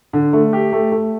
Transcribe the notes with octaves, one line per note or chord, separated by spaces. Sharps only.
D3
A3
G4
A3
A3